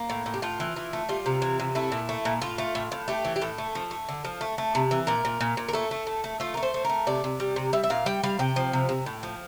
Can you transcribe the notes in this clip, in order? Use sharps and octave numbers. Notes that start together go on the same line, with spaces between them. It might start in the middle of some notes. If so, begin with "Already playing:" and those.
Already playing: A#3
A2
A2
G4
A2 F4
E3
E3
A3
G3 F4
C3
E3
C3
A3 E4
A#2
A3
A#2
A2 F4
A3
A2
A2
A3 G4
E3
G4
A2 A4
A3
F3
A3
D3
F3
A3
A3
C3
E3
A#2 A#4
A#2
A#2
A#2
A#4
A3 A4
A3
A3
A3
A3 F4
A#4
A3
C5
A3
A3 A#4
C3 D5
C3
G3
C3
G3 E5
E5
A#2 F5
G3 G5
G3 F5
C3 G5
F3
C3
C3
A2
F3